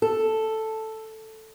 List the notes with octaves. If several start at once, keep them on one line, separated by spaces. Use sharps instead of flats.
A4